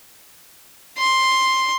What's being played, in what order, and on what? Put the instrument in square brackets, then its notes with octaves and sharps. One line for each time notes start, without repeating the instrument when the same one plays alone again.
[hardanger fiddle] C6